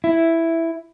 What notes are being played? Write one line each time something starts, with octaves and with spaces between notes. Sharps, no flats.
E4